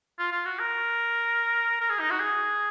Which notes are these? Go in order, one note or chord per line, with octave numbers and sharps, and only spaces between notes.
F4
F4
F#4
A#4
A#4
G#4
D#4
F#4
G#4